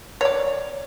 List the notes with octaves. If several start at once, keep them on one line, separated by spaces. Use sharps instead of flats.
C#5 D5